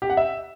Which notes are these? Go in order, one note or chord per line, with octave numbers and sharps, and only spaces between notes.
G4
F#5
E5